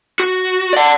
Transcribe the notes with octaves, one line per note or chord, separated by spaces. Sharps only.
F#4
D5 F#5